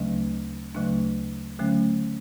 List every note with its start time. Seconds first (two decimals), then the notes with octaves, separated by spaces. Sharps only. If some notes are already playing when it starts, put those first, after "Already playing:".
Already playing: D2 C#3 F#3 A3 D4
0.75 D2 C#3 F#3 A3 D4
1.59 D3 F#3 A3 C#4